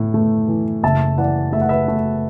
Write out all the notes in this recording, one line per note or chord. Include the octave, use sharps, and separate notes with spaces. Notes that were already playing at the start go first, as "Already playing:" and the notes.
Already playing: A2
A3
E3
F#1 E5 A5
E3 D5 F#5
A3 E5
F#5
B4 E5
A3